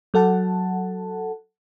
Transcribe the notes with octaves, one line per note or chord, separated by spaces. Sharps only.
F#3 A4 F#5 A5